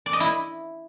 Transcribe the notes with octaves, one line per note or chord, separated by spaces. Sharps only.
D5
D#5
E4